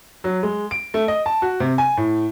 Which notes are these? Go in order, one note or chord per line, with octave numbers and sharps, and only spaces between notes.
F#3
G#3
D7
A3
D#5
A5
F#4
C3
G#5
A2